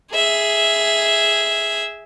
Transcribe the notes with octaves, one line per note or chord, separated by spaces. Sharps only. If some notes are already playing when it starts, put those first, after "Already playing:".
G#4 E5